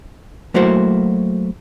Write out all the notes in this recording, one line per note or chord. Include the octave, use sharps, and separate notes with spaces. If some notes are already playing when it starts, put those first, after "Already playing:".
F#3 A3 A#3 E4 F#4 C5